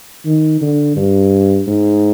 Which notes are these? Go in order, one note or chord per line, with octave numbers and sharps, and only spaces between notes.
D#3
D3
G2
G#2